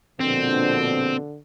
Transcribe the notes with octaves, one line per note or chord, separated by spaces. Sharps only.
A#1 B2 D3 C4